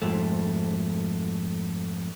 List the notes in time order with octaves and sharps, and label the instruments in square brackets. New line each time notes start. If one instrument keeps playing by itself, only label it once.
[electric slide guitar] F2 G#2 A3